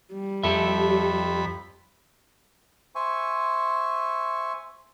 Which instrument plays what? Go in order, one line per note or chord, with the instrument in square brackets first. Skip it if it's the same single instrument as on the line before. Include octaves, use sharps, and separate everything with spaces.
[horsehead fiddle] G3
[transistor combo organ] F2 B5 [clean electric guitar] G4 A4 E5
[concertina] C5 E5 G#5 C#6